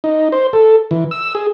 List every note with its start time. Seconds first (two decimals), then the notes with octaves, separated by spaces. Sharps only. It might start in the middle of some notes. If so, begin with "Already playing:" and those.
0.04 D#4
0.32 C5
0.53 A4
0.91 E3
1.11 E6
1.35 G#4